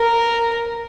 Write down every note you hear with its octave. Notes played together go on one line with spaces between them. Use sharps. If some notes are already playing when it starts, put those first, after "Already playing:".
Already playing: A#4